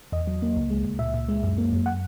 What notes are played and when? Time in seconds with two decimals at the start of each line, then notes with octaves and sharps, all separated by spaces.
0.12 E2 D#5
0.27 F#3
0.42 A#3
0.56 C#2
0.70 G#3
0.85 C#2
0.99 A#2 E5
1.14 A#2
1.29 G#3
1.43 F#2
1.58 A#3
1.72 F#2
1.86 F#5